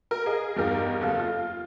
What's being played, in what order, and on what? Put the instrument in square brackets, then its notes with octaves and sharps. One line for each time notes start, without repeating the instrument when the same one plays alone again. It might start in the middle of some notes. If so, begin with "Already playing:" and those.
[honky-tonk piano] A#4
G#4 D#5
E2 G2 D#4 G4 A#4 F5
F#1 A4 F5
F4